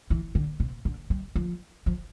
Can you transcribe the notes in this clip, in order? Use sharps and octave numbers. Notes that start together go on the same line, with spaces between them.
E3
D3
C3
D3
G3
F3
F3